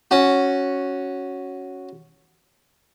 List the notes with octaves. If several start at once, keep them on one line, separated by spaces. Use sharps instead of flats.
C#4 F#4